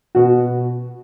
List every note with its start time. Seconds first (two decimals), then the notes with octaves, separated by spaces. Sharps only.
0.15 B2 F#4